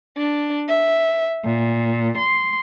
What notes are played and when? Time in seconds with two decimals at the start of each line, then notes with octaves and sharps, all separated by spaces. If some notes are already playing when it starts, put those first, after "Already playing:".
0.16 D4
0.69 E5
1.45 A#2
2.17 C6